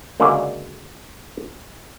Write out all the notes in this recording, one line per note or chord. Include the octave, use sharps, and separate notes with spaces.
C#2 D3 A#3 F#4 G#4 D5